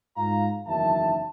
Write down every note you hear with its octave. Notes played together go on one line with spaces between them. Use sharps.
G#2 F4 F5 A#5
F#1 E2 D#3 F#3 E5 A5